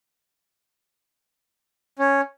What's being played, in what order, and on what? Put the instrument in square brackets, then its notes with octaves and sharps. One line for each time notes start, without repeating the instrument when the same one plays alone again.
[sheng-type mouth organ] C#4